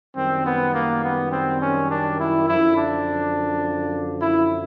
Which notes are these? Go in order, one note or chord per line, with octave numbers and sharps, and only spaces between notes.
F#2 D#3 G3 C4
B3
A#3
B3
C4
C#4
D4
E4
F#2 D3 F3 E4
D4
E4